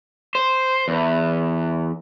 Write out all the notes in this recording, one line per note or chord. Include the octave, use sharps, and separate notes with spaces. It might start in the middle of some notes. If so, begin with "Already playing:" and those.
C5
E2